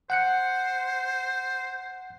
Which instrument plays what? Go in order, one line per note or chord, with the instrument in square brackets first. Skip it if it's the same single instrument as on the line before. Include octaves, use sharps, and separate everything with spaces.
[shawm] C5 [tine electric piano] F#5 F#6 C#7